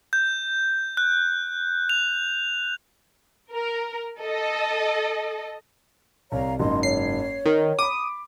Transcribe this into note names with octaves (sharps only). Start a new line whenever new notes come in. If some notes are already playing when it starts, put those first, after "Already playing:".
G6
F#6
F7
A#4
A4 D#5
C2 C#5 F5 A#5
F#1 G#2 D#5 C6
C#5 C7
D#3 A#4
B5 D6 D#6